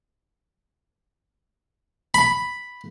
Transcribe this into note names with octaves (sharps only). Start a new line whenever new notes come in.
B5